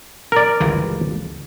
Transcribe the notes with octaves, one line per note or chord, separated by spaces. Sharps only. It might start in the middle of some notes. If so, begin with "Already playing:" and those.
A#4 D5
G1 C#2 E3